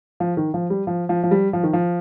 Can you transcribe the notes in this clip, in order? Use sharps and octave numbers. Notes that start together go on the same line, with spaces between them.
F3
D#3
F3
G3
F3
F3
F3
G3
F3
D#3
F3